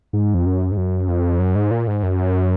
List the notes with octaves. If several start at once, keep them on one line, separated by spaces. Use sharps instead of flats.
G#2
F2
F#2
G#2
F#2
F2
F#2
G#2
A#2
G#2
F#2